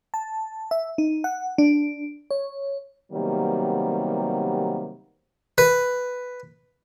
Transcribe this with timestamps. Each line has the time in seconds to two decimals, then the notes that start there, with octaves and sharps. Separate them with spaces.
0.14 A5
0.71 E5
0.98 D#4
1.24 F#5
1.58 D4
2.31 C#5
3.13 C3 D#3 F#3 G3 A#3 B3
5.58 B4